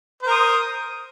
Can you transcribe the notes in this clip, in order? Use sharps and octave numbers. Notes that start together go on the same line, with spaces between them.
A#4 C5 D#6